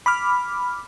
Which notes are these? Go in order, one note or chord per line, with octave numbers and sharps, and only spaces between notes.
B5 D6 F6